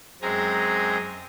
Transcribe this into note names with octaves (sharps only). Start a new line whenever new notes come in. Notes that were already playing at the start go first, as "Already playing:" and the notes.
F#2 G#3 C4 G#4 G#5 A#5